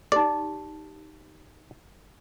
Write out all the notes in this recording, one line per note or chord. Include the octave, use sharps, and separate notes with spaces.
D#4 G4 D5